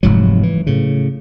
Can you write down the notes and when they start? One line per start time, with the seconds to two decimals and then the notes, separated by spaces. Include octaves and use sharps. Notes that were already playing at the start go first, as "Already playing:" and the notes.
0.03 F1 G#2 F#3
0.43 E3
0.67 A2 C#3